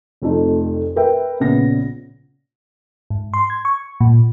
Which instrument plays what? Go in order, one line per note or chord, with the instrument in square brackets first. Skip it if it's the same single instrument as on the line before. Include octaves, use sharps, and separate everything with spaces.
[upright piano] F1 F2 A3 D#4
A#4 B4 E5 G5
A#1 C#3 B3 A#6
[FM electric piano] G#2
C6
G#6
C#6
A#2